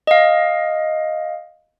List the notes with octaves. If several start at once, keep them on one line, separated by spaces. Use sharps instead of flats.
D#5 F5